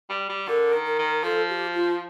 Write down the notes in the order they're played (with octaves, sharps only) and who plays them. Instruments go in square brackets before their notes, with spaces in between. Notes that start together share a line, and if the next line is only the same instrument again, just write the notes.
[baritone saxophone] G3
G3
[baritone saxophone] D3 [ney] A#4
[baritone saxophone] D#3
[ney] A#4
[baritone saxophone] D#3
[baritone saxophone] F3 [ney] A4
[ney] G4
F4